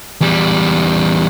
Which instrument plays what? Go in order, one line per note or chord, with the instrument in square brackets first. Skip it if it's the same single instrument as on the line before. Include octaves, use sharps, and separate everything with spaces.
[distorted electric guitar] E2 G3